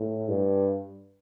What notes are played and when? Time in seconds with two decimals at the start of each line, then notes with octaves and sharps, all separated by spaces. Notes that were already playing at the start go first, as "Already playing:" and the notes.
Already playing: A2
0.28 G2